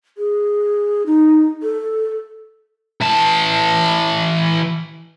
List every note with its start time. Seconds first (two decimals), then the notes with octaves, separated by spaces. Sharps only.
0.18 G#4
1.06 D#4
1.63 A4
3.02 E3 A5